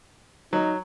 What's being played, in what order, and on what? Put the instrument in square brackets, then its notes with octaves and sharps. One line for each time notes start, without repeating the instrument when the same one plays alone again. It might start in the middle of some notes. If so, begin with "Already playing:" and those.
[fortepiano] F#3 [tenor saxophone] D#4